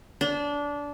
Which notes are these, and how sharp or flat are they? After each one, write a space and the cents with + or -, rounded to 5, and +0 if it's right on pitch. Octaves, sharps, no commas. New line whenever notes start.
D4 -20